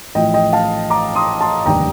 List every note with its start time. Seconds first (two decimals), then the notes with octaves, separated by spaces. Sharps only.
0.15 A1 A2 F3 D#5 G5
0.34 D#5 G5
0.53 F5 A5
0.90 A#5 D6
1.15 C6 D#6
1.40 A5 C6
1.66 F1 D#2 D3 G3 D4 G5 A#5